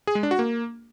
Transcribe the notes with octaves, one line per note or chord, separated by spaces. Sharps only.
G#4
G#3
D4
F#4
A#3